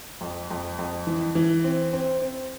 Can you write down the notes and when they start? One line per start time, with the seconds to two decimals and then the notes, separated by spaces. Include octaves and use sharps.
0.21 F2
0.50 F2
0.79 F2
1.07 E3
1.35 E3
1.64 C4
1.93 C4
2.22 C4